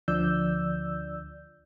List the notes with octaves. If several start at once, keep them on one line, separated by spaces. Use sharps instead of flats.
D2 D3 F3 D5 E6 G6